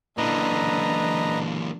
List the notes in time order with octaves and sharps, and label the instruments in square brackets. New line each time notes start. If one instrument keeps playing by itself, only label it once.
[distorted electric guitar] A#2 E3 [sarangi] D3 [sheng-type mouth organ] B4 D#5 A#5